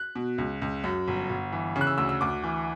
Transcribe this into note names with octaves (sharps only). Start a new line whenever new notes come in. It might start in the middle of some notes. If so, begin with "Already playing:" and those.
Already playing: F#6
B2
C#2
C#2
F#2
G1
G1
E3
C#3
F#6
E6
D2 E6
E6
D2 D6
E3